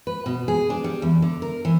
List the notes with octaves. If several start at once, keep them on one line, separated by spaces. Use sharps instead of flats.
B4
B2
G#4
D4
G3
E2
D3
A#4
E3